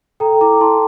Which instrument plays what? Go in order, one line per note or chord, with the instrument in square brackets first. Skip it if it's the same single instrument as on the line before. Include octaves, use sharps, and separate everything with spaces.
[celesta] A4 G5 A#5
E4 A#5 D6
E4 A5 C6